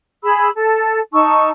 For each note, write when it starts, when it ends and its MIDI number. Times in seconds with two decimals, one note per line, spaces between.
0.24 0.49 68
0.24 0.49 83
0.24 0.49 88
0.56 1.00 69
1.14 1.50 63
1.14 1.50 81
1.14 1.50 85
1.14 1.50 88